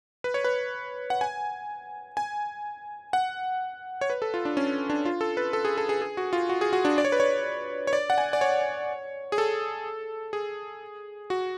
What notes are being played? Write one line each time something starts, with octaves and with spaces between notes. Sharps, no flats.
B4
C#5
B4
F#5
G#5
G#5
F#5
C#5
B4
A4
F4
D4
C#4
D4
F4
A4
B4
A4
G#4
A4
G#4
G#4
F#4
F4
F#4
G#4
F#4
D4
D5
C#5
B4
C#5
C#5
D5
F#5
G#5
D5
C#5
G#4
A4
G#4
F#4